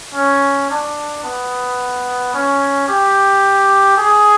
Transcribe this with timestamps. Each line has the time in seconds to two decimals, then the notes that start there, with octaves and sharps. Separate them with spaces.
0.14 C#4
0.70 D4
1.24 B3
2.34 C#4
2.89 G4
3.98 G#4